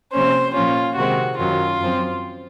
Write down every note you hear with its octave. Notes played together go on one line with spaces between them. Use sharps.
C3 F3 A#3 C#4 C5
A#2 F3 A#3 C#4 F4
C3 D#3 G#3 C4 F#4
F#2 D#3 F#3 C#4 F4
F#2 F3 C4